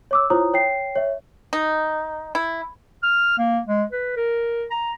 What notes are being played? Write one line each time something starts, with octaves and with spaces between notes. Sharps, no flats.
C#5 D6 E6
E4 F4 C5 C#5 A#5 D#6
C#5 G5 C7
C#5 E5
D#4
E4
F6
A#3
G#3
B4
A#4
A#5